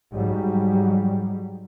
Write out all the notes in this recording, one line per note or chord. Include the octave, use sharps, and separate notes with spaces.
G#2 F#3 G3